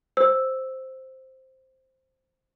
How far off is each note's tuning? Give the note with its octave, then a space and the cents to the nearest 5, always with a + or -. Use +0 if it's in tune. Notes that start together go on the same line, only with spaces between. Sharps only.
C5 +0 E6 +0